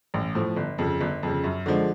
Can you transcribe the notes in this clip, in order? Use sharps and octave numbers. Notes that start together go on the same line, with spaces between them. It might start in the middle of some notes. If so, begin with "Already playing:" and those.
A1
A2 F3
G1
F2 C#3
G1
F2 C#3
F#2
D3 F3 G#3